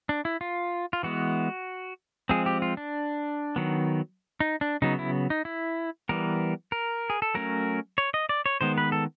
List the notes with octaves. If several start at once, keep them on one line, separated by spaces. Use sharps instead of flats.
D4
E4
F4
F4
E3 G#3 B3 F#4
F3 G#3 C4 G#4
G4
F4
D4
D#3 F#3 B3
D#4
D4
C#3 F#3 B3 D#4
E4
D#4
E4
E3 G3 B3 A#4
A#4
G#4
A4
F#3 A3 C#4 A#4
C#5
D#5
D5
C#5
D#3 G#3 B3 C5
B4
A4